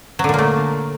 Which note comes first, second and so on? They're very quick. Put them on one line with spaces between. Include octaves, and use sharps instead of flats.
F#3 D3 A#2 A#3 A3